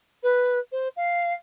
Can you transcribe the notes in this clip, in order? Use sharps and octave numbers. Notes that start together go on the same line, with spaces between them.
B4
C5
F5